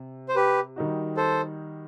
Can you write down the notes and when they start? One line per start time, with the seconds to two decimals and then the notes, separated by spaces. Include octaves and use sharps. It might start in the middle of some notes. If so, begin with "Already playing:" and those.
Already playing: C3
0.28 C5
0.35 G4 B4
0.76 D#3 G3 D#4 F#4
1.17 A4 C5